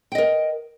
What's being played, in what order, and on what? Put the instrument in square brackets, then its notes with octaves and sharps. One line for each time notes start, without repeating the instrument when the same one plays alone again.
[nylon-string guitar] G5
D#5
A#4